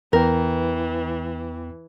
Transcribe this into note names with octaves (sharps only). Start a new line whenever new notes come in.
E2 E3 B3 A#4 G5